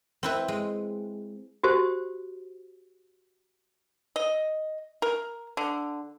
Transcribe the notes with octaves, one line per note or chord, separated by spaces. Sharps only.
C4 E4 B4
G#3
F#4 G4 C5
D#5
A#4
D3